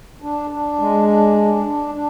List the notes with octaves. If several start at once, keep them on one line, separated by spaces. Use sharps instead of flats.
D4
D4
G#3
D4
D4
D4
D4